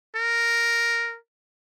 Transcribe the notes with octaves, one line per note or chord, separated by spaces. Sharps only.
A#4